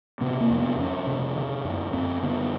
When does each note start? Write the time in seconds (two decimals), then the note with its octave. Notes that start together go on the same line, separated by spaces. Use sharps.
0.21 C3 B3
0.41 A#3
0.50 F2
0.60 B3
0.78 F2 C#4
1.07 C3
1.36 D3
1.65 F#2
1.93 F#2 C4
2.22 D3 B3